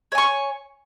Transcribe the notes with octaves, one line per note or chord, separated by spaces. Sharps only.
C#5 G#5 C#6